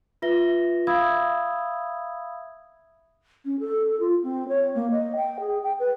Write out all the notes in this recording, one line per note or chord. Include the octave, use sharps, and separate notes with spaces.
F4 B4 E5 A#6 G7
E5 F5 B5 D#6 E6 G#6
C#4
A4
F4
C4
C#5
A#3
D#5
G5
G#4
G5
B4